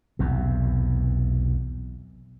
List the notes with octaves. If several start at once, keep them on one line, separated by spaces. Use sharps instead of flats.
B1 E2 C3